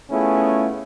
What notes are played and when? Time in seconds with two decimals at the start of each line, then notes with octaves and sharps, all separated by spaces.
0.10 A3 B3 C#4 E4 F4 G#4